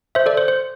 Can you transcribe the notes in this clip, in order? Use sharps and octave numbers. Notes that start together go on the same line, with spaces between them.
C5 E5
A4 D5
C5
C5